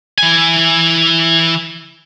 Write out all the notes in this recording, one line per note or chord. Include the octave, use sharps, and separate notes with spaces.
E3 G#5